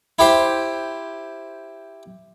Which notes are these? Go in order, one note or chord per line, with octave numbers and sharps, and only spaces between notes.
E4 G4 C5